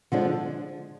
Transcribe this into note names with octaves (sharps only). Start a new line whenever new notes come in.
D3 F3 G#3 D4